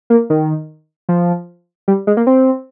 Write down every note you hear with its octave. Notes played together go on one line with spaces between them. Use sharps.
A#3
D#3
F3
G3
G#3
A#3
C4